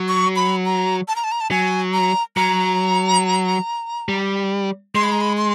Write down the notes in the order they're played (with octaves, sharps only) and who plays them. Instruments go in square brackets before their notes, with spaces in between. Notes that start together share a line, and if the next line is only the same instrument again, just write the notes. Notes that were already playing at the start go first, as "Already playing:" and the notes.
Already playing: [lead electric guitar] F#3
[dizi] C#6
B5
A#5
A5
A#5
A5
A#5
A5
[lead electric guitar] F#3 [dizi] G#5
[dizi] A#5
[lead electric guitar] F#3 [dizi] A#5
[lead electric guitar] G3
[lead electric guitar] G#3 [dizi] C6
[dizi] B5
A#5
B5
C6